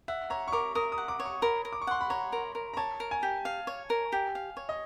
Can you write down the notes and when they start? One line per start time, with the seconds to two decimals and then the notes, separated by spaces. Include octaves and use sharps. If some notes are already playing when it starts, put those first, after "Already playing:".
0.08 E5 F#5
0.30 C#5 A#5
0.48 C#6
0.53 A#4 D6
0.75 A#4 D#6
0.92 D#6
0.98 F#5
1.08 D6
1.20 C#5
1.25 C#6
1.42 A#4 B5
1.65 A#4
1.73 D6
1.82 C#6
1.87 F#5 C6
2.01 B5
2.10 C#5 A#5
2.33 A#4
2.55 A#4
2.74 A#5
2.77 C#5 A5
3.00 A#4
3.11 G#5
3.23 G4
3.45 F5
3.67 C#5
3.90 A#4
4.12 G4
4.35 F5
4.57 C#5
4.69 D#5